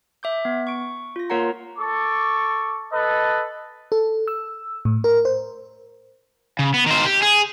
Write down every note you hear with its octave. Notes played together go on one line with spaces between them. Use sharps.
E5 D6 G6
B3
C#6 D7
F4 A#6
A#3 F4 A#4 C#5 F#5 A#5
A4 C#6 D6
A4 B4 D#5
A4
E6
A2
A#4
C5
C#3
B3
D#3 C5
G4
G#4